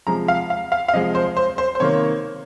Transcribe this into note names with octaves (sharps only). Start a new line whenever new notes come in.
C3 F3 G#3 A#5
F5
F5
F5
F5
C3 F3 G#3 D#5
C5
C5
C5
C5
C3 D#3 A#3 C#5